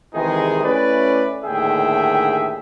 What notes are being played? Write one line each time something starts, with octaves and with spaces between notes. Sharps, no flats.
C3 D#3 E3 G#3 D#4 G#4
A3 C#4 E4 B4 D5
D#2 A2 D3 G#4 E5 G5